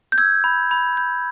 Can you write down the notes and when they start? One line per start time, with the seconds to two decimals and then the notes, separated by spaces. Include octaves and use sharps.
0.12 G6
0.18 E6 G#6
0.44 B5
0.71 B5
0.97 G6